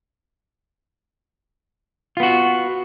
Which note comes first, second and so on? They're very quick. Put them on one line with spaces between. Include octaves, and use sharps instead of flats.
F4 B3 F#4